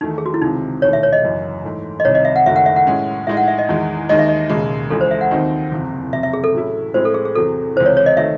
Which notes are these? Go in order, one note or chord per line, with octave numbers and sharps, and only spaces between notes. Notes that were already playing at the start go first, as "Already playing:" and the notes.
E2 D#3 A3 D#4
G#4
F#4
E4
C#2 C3 D#3 D#4
E1 D#2 D#3 A3 C#5
E5
C#5
D#5
F#1 F#2 E3
G#2 E3 A3
D#5
C2 C3 D#3 C#5
D#5
E5
F#5
F#1 F#2 D#3 A3 E5
F#5
E5
F#5
A2 G#3 C#4
A2 G#3 D#4 E5
F#5
E5
D#5
E2 D#3 G#3
D#2 D#3 G#3 D#4 D#5
E5
D#5
E1 D#2 C#3 G#3 G#4
C#2 C#3 E3 G#3 A4
C5
E5
F#5
D#2 D#3 F#3 C4 D#4
F#1 E2 C3
F#1 E2 C3 E5
E5
G#4
A4
A2 F#3 C#4 E4
A2 G#3 C4 E4 C5
A4
G#4
G#4
E2 C3 F#3 A4
C#2 C3 E3 C5
C#5
C#5
D#5
D#3 A3 D#4 E5